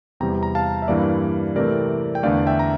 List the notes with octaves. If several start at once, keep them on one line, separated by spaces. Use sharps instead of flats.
E2 C3 G3 C4 G5 A#5
A#5
F5 A5
E5
G2 E3 G3 A#3 D5 F5
C3 E3 A3 C4 A#4 D5
G5
E2 D3 A3 D5 F5
E5 G5
A#5